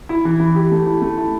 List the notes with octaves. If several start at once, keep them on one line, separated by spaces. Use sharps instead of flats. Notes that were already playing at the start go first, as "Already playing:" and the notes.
E4
E3
E3
G4
A3
E4
A3
E4